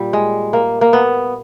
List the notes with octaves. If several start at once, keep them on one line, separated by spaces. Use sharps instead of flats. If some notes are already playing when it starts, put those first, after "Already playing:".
Already playing: A#2 G3
G#3
A#3
A#3
B3